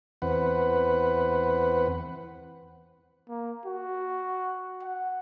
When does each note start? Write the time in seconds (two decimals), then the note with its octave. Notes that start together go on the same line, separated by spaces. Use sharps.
0.22 E2 C4 B4 F#5
3.29 A#3
3.66 F#4
4.83 F#5